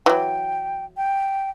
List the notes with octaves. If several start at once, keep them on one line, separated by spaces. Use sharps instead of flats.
E3 F#3 G5
G5